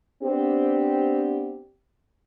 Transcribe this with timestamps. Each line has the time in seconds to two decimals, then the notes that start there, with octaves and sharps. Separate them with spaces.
0.23 B3 C4 D4 G4